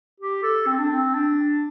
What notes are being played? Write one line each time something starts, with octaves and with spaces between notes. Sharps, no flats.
G4
A4
C4
D4
C4
D4